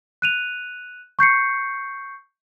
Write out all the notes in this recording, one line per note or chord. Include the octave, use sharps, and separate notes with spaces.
F#6 D#7 F7
C#6 G6 C7 C#7